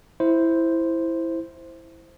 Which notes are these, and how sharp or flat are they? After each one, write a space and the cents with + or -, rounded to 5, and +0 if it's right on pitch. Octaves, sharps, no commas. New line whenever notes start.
E4 +0 C5 +0